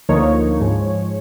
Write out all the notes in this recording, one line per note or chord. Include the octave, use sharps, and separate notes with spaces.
D2 D3 F3 A#3 D#4 C#5
G#2 F3 G#3